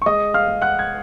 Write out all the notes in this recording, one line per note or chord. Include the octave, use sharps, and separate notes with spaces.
C#6
G#3 D#5 D#6
F5 F6
G#3
F#5 F#6
G#6